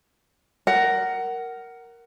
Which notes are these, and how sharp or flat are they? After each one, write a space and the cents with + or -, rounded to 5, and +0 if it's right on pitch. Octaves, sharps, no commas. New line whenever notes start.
A#4 +0 F#5 +20